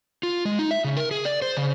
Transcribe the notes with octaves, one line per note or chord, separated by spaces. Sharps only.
F4
G#3
D#4
E5
C#3
A#4
G#4
D5
C5
C#3